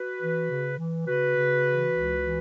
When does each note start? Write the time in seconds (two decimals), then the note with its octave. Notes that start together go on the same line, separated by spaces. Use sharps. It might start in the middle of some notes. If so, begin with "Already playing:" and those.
Already playing: F#4 B4
0.21 E3
0.50 C#3
0.78 E3
1.07 C#3 F#4 B4
1.36 C#3
1.65 E3
1.94 C#2
2.23 E3